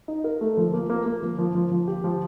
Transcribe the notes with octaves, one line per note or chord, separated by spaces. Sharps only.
D#4
A#4
A3
F3
A#3
A#3
A#3
F3
F3
F3
F3
G4
F3